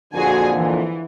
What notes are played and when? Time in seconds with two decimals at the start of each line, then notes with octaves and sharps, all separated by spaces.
0.14 F2 A#2 D3 F#4 G#4 G#5
0.55 E3